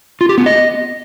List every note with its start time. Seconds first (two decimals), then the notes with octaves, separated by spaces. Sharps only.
0.21 F4
0.29 G4
0.38 B3
0.46 D#5